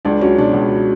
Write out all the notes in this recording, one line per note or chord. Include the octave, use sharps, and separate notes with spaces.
C#2 D4
F#3 C#4
B2 D4
C#2